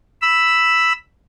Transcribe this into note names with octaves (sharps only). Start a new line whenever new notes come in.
B5 E6